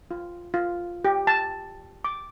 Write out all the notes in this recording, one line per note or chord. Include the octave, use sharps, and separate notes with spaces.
F4
F4
G4
A5
D6